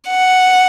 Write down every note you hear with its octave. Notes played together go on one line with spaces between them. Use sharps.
F#5